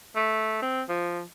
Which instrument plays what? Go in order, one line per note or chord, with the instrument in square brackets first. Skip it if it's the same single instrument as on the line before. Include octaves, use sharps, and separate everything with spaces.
[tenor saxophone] A3
C4
F3